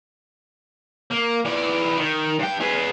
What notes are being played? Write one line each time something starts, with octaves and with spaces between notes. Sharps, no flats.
A#3
E3 D5
D#3
G2 G5
G#4 B4